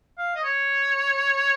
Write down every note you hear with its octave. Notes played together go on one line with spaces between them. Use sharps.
F5
D#5
C#5